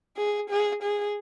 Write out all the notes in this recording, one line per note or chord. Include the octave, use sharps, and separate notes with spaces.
G#4
G#4
G#4